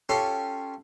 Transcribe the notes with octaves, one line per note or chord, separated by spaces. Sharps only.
C#4 F4 G4 A4 C6